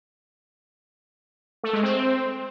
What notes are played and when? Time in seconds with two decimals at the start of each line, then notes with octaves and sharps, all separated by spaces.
1.63 A3
1.73 G#3
1.83 C4